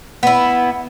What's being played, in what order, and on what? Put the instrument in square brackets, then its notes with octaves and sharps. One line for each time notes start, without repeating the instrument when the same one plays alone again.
[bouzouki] B3 E4